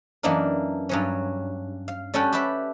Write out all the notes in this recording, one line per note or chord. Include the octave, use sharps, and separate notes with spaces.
F#2 E3 A#3 D4 D#4 A#4
G2 F#3 C#4
F5
G3 C#4 F#4 A4 F#5 G5
G4 A4 B4 D5 E5